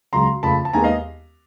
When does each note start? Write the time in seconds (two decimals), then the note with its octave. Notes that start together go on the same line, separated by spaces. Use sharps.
0.13 C#2 C#3 F#3 A#5 C6
0.43 F2 C#3 F3 A3 A5 B5
0.65 A5
0.73 D#2 D#3 G#3 B3 G#5 A#5
0.84 D#5 F5